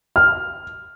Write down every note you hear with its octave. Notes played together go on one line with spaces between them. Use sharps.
F6